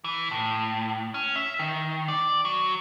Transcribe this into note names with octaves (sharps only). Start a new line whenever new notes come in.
E3
A2
C#4
E5
D#3
D5
F#3